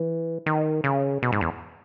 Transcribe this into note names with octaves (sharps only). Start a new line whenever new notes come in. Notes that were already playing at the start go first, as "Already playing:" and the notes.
Already playing: E3
D#3
C#3
B2
G#2
E2